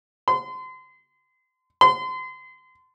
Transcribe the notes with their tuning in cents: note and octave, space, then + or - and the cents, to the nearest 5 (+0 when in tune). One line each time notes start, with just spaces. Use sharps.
C6 -35
C6 -35